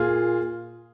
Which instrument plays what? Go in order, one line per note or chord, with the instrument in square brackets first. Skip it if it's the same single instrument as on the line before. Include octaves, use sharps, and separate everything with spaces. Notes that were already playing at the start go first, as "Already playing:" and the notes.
Already playing: [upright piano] A#2 F4 G#4